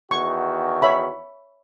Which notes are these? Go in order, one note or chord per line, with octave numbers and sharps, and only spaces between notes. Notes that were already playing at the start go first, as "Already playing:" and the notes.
E2 D#3 F#4 C#6
C#5 E5 B5